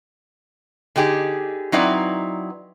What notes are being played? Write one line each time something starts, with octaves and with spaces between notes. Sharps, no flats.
D3 D#4 G4 G#4
F#3 C4 D#4 E4 B4 D5